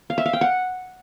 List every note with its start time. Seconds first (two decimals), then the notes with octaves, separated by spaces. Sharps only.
0.10 F5
0.18 E5
0.26 F5
0.33 G5
0.41 F#5